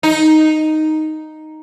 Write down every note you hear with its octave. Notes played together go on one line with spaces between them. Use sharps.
D#4